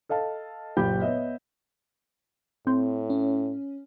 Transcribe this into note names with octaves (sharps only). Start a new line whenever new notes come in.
A4 D#5 F5 A5
F#1 A#2 G4 B5 G6
B3 C#5 D#5 E5
A2 C4
C#4